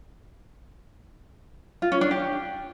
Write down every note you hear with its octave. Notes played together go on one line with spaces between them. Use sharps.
F4
C#4
D4
G4